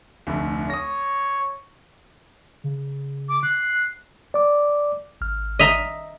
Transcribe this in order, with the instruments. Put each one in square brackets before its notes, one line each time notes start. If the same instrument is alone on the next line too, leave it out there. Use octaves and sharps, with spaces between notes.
[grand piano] F1 D2
[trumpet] C#5 [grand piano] D#6 A#6
[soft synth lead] C#3
[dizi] D6
[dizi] F#6 [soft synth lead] C7
[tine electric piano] D5 D6
G#1 F6
[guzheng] D#5 E5 A#5